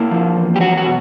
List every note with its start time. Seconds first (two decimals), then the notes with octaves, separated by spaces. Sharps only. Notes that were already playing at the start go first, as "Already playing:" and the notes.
Already playing: A#3 E4
0.11 F3
0.36 E2
0.56 G4
0.60 F#3 F#4
0.77 F#4
0.85 B2